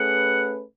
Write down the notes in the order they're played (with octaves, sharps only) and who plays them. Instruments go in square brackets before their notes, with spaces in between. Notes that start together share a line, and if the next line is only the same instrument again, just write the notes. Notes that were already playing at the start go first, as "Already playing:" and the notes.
Already playing: [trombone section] A3 C#4 G#4 B4 [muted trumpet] F#5